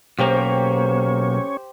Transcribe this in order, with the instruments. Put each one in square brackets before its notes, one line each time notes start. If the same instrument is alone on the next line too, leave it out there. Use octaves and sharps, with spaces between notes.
[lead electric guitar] B1 A#3 [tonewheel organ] C#4 C#5 [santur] G4 C5 G5